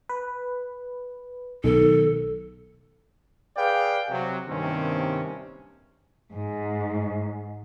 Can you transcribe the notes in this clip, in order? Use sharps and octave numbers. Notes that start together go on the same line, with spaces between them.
B4
B1 D#3 A4
G#4 B4 D5 F5 G5
C3 F#3
G2 C3 D#3 A#3 C4 C#4
G#2